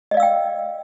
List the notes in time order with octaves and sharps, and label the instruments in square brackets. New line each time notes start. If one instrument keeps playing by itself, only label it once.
[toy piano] D#5
D5
F5
E6
G5